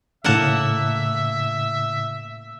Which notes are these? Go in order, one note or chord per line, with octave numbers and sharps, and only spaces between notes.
A2 C#3 A#3 E5 F#5 A5